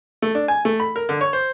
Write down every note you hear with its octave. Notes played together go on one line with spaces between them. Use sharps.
A3
D4
G#5
A3
B5
A#4
D3
C#5
C5